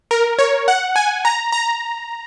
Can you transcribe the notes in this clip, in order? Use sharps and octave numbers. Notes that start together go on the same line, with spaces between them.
A#4
C#5
F#5
G#5
A#5
A#5